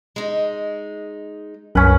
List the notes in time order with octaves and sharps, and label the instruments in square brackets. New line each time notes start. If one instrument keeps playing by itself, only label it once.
[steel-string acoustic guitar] G#3 D#4
[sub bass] C2 [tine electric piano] F#2 [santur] C#4 B4